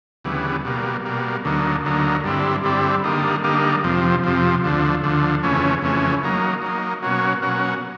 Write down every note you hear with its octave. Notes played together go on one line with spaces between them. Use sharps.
D2 C#3 E3 G3 B3
B2 G3 A#3
B2 G3 A#3
D2 D3 F#3 A#3 D#4
D2 D3 F#3 A#3 D#4
G2 D3 G3 C4 E4
G2 D3 G3 C4 E4
D3 G3 A#3 D#4
D3 G3 A#3 D#4
F2 C3 F3
F2 C3 F3
D2 D3 F3
D2 D3 F3
F2 C#3 E3 A3 C#4
F2 C#3 E3 A3 C#4
F#3 A#3 D#4
F#3 A#3 D#4
B2 F#3 A#3 C#4 F#4
B2 F#3 A#3 C#4 F#4